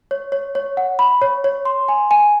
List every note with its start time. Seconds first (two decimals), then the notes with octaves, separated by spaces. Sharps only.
0.11 C#5
0.32 C#5
0.55 C#5
0.77 F#5
0.99 B5
1.22 C#5
1.44 C#5
1.65 C6
1.88 G#5
2.11 G#5